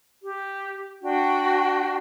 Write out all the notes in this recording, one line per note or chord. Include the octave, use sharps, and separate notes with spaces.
G4
D4 F#4 G5